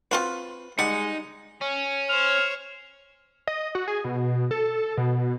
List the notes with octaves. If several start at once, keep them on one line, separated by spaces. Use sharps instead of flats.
C4 F4 F#4 B4
G3 G#3 D#4 F#5
C#4
C5 C#5 F6
D#5
F#4
G#4
B2
A4
B2